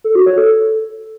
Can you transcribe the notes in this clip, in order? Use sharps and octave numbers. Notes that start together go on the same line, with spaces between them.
A4
F#4
C#5
A4